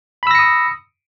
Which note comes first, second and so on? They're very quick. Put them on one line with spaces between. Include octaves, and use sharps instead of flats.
B5 E6 A#6 C#7 D#6